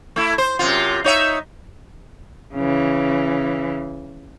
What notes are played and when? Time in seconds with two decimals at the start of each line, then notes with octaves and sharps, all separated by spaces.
0.16 A3 E4
0.38 C5
0.59 F#2 C3 F4
1.04 D#4 C#5 E5
2.54 C#3 E3